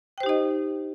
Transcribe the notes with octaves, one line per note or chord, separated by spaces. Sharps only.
D#4 G4 C5 D#5 G5